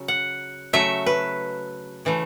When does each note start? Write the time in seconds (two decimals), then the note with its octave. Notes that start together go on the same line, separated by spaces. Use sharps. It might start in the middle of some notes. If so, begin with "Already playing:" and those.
Already playing: C#3 F#3
0.08 F#5
0.73 C#3 F#3 A3 E5
1.06 B4
2.05 C#3 E3 A3